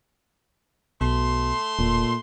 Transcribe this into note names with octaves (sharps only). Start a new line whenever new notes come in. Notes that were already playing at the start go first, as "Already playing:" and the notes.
B1 B2 A3 C6
E1 A#2